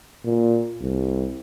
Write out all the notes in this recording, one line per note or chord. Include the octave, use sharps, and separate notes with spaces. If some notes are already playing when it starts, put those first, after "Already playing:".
A#2
C2